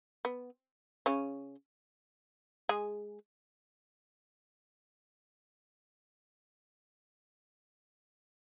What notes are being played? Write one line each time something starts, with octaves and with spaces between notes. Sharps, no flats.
B3
C#3 C#4
G#3 G#4